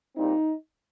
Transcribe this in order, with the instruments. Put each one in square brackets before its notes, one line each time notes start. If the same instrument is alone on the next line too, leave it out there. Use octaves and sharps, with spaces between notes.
[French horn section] A#2 G3 C4 D#4